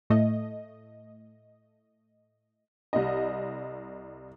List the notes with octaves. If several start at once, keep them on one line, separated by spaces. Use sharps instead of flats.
A2 A3 D#5
C2 D#5